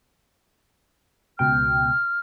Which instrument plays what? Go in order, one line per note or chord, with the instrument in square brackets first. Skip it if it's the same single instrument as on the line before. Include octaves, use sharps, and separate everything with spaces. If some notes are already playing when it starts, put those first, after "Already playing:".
[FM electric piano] C#2 B2 G5 [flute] F6